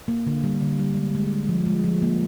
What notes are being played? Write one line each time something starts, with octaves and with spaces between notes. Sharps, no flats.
A#3
D3
G3
D3
G3
G#3
G#3
G#3
F3
G#3
F3
A#3